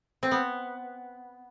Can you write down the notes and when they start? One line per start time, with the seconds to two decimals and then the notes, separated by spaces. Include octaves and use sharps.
0.23 C4
0.31 B3